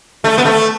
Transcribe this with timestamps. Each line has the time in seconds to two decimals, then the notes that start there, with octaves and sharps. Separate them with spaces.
0.24 A3
0.38 B3
0.45 A3